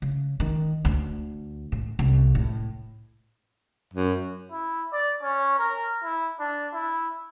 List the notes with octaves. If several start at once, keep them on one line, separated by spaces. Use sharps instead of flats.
C#3
D#3
D2
A2
C2
A2
F#2
E4
D5
C#4
A#4
E4
D4
E4